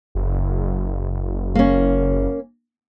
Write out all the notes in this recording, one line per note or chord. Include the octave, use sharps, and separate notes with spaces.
F#1
A#3 C#4